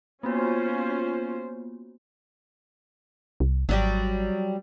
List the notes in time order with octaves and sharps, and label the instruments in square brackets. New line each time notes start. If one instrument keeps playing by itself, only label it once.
[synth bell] A#3 B3 F#4 [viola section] C#4 F4 C5
[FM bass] C2
[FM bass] G#1 [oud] F#3 G3 G4